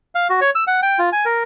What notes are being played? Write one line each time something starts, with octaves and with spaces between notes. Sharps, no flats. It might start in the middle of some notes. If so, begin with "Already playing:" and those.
F5
F#4
C#5
E6
F#5
G5
F4
G#5
A#4